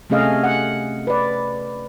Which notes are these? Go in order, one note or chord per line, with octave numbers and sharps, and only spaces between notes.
C3 A3 C#4 G#4 D#5 F5
F#5
B4 D5